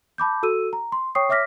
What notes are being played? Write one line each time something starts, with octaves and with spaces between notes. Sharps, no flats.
A5 B5 D6 G6
F#4 A4 E6 D#7
A#5
C6
C#5 G5 C#6 D#6 C7
C#5 E5 D6 F6 A#6 B6